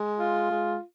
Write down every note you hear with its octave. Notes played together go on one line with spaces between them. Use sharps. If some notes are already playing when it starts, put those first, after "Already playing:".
Already playing: G#3
F4
G#3